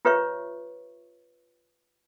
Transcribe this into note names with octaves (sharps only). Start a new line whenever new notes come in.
F4 G4 B4 C#5 E5 C#6